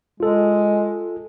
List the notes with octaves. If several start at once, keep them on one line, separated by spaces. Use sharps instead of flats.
G#3 F4 A4